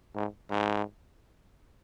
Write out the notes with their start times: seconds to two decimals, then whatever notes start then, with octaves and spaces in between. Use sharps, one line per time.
0.15 G#2
0.50 G#2